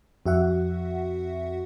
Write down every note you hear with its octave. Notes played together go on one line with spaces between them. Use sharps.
F2 F#4 E5 F#5